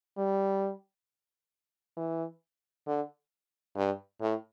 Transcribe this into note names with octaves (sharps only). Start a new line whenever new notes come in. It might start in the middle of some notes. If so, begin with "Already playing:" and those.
G3
E3
D3
G2
A2